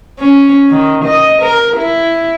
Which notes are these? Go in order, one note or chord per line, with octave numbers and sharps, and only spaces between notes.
C#4
D#3
D#5
A#4
E4